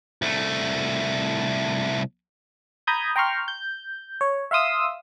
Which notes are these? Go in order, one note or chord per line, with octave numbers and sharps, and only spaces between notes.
C2 A3
A#5 B5 D#6 G6 G#6
G5 A#5 C6 C#6 F6
G6
C#5
E5 F5 C6 D#6 E6